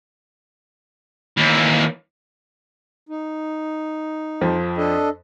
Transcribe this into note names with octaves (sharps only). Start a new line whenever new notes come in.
D#2 E3
D#4
F2 F3
D4 A4 D#5